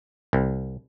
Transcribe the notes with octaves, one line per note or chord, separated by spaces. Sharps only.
C2